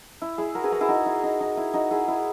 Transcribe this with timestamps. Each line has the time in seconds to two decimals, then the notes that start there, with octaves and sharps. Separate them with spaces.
0.22 E4
0.38 E4 G#4
0.55 F#4 A#4
0.64 G#4 B4
0.72 F#4 A#4
0.81 E4 G#4
0.89 D#4 F#4
1.06 E4
1.23 D#4
1.40 D#4
1.57 E4
1.74 D#4 F#4
1.91 E4 G#4
2.08 E4